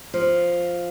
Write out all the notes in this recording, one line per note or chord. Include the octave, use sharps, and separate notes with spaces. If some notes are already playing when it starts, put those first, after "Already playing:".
F3